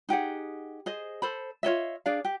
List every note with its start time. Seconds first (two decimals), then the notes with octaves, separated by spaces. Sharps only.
0.09 D#4 G4 G#4 F#5
0.86 G#4 C5 D#5
1.22 A4 C5 B5
1.63 F4 C#5 D#5 E5
2.06 D4 G#4 D5 F5
2.25 G4